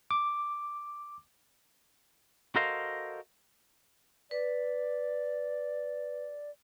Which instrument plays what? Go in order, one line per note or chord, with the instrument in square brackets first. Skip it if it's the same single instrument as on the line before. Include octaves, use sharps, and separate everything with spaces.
[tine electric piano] D6
[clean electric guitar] F#4 A4 A#4 C5 D#5 F5
[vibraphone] B4 [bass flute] D5